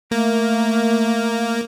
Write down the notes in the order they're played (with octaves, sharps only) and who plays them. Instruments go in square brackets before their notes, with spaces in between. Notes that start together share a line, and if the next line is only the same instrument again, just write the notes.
[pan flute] A3 [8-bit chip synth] A#3